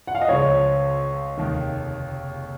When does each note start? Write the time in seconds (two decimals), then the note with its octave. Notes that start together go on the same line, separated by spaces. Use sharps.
0.07 F#5
0.15 F5
0.21 D#5
0.28 C#2 C#3 F3 C#5
1.37 F1 D#2 D#3